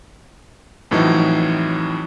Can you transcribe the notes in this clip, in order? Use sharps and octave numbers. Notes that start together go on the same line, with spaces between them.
F2 A2 E3 F#3 C4 D#4